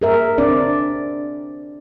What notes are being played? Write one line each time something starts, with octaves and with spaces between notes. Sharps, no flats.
G#4 A#4 E5
C4 D4 D5